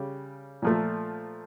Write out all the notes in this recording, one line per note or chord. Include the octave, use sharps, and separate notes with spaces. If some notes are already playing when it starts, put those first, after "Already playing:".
Already playing: C#3 G3
A#2 F3 A3